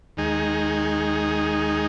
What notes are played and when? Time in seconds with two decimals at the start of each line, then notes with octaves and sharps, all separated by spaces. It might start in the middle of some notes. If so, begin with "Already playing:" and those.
0.17 D#2 D#3 G#3 D#4 G#4